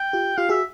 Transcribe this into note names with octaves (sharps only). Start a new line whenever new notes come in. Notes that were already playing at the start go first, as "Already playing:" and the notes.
Already playing: G5
F4 G4
F4 G4 F5
F#4 G#4 E5